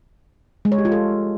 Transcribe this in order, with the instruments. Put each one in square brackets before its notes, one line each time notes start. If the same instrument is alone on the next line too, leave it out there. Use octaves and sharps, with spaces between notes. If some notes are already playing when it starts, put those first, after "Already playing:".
[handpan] G#3
C#5
G4
F4
A4